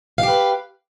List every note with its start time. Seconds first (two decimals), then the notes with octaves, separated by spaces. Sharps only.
0.18 F5
0.23 G4
0.28 B4